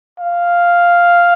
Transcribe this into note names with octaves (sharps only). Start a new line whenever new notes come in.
F5